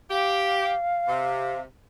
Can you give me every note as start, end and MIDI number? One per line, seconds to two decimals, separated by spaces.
0.11 0.73 67
0.11 1.60 77
1.08 1.61 48